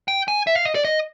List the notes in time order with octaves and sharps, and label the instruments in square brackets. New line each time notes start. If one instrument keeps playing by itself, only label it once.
[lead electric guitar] G5
G#5
E5
F5
D#5
D5
D#5